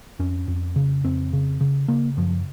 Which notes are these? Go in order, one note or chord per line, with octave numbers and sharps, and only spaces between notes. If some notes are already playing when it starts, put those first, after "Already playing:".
F2 C#4
F2
C#3
F2 C4
C#3
C#3
C#3 A#3
F#2 F3